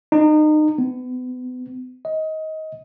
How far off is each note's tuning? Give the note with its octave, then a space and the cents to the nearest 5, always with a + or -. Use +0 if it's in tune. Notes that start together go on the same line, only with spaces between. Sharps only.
D#4 -30
B3 +35
D#5 +20